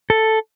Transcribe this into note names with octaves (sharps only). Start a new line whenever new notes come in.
A4